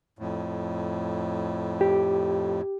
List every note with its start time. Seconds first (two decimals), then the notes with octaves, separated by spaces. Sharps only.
0.19 F2 A2
1.81 G4